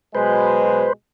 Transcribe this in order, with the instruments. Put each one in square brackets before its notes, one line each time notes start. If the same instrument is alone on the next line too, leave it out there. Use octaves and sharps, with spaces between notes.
[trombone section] B2 F#3 G#3 [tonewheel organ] B4 C5